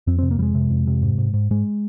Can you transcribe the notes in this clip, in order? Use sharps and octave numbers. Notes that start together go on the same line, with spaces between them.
F2 C4
C3 C4
A#3
F2 G3 G#3
C3
F2
C3
G#2
G#2
G#2
G#2 G#3